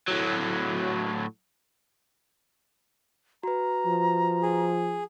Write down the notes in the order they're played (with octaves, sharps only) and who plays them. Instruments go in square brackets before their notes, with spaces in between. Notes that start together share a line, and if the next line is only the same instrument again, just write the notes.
[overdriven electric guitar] A2 F#3
[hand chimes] F#4 B4 [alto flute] A#5
[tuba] F3
[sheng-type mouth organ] G#4